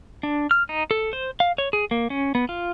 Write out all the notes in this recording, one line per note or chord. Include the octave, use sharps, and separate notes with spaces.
D4
F6
D#4
A4
C5
F5
C#5
G#4
A#3
C#4
B3
F4